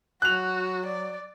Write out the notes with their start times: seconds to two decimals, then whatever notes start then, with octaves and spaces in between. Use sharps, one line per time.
0.22 F#3 F#4 F#6 F7
0.86 D5